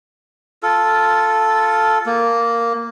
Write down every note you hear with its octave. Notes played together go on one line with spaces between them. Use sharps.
F4 A4
A#3